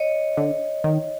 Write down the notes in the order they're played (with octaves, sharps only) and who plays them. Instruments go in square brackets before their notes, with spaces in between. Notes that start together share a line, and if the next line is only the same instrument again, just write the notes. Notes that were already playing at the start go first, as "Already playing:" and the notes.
Already playing: [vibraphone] C#5 D#5
[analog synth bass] D3
D#3